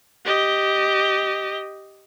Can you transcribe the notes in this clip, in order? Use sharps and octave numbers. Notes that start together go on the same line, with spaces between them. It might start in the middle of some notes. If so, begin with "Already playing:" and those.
G4 D#5